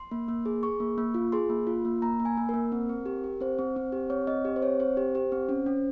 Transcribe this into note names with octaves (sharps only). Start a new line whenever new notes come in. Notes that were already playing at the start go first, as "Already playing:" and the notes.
Already playing: C6
A#3
A#3
G#4
G#4 C#6
A#3
A#3
F4
G#4 C6
A#3
F4
A#3
A#3 A#5
A#3
G#5
A#3
A#4
A#3
C4
C4
G4
G4
C4 C5
C4
C4
G4
C4 C#5
C4 D#5
G4
C5
C4 C#5
C4 C5
G4
G4
C4
C#4
C#4